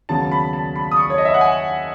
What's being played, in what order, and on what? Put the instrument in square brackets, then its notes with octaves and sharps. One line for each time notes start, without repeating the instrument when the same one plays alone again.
[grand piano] D#2 C#3 F#3 B3 A5
B5
A5
B5
D#6
C#6
C#5
D#5
E5
F#5
G#5